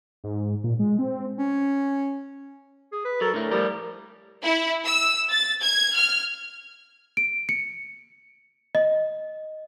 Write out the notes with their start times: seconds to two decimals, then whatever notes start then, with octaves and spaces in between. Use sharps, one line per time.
0.24 G#2
0.64 A#2
0.79 G#3
0.99 C4
1.39 C#4
2.92 G#4
3.05 B4
3.21 F#3 A4 A#4
3.34 A2 D3 A3 A#4
3.51 A2 F3 G3 A#4
4.43 E4
4.86 E6
5.30 A6
5.62 G#6
5.94 F6
7.17 D7
7.49 C#7
8.75 D#5